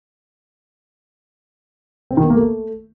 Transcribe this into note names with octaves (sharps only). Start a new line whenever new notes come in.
C4
D#3
B3
A#3
A3